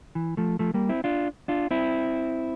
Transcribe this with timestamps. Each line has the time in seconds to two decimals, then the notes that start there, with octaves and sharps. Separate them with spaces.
0.15 E3
0.37 F3 A3
0.59 F3 A3
0.74 G3 A#3
0.89 C4 E4
1.04 D4 F4
1.48 D4 F4
1.71 C4 E4